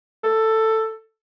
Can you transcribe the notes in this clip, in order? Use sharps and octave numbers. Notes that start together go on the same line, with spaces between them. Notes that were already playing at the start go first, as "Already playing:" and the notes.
A4